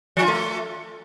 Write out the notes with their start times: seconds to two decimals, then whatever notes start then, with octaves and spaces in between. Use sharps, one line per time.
0.17 F3
0.22 F4
0.28 A3